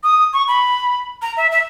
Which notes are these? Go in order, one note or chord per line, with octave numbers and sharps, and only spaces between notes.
D#6
C#6
B5
A#5
E5
E5